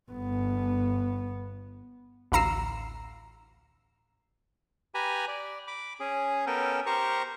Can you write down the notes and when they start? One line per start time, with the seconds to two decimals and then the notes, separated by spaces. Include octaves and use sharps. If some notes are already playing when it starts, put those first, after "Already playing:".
0.11 G1 B3
2.32 A1 D2 F5 A#5 E6 C7
4.95 G4 B4 G#5 A#5 B5
5.28 D5
5.68 B5 D6
6.00 C#4 G#4
6.47 B3 C#4 A4 A#4 G5
6.86 G4 A#4 C5 A#5 C#6